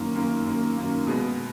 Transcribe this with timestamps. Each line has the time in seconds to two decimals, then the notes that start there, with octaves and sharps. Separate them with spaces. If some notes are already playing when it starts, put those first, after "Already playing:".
Already playing: F#2 D#3 A#3
0.15 F#2 D#3 A#3
0.46 F#2 D#3 A#3
0.77 F#2 D#3 A#3
1.07 B2 G#3 B3